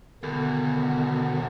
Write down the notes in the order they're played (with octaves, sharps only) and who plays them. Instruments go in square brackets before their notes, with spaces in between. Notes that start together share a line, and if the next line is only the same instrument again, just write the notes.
[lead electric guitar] E2 B2 [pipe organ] D3 D#3